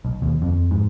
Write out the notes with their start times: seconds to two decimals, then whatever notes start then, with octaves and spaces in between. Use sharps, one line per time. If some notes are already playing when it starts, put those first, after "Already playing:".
0.05 B1
0.22 D#2
0.42 F2
0.71 G#2